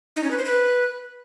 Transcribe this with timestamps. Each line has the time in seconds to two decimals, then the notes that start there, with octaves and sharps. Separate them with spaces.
0.16 D#4
0.24 C#4
0.31 B4
0.38 C5
0.45 B4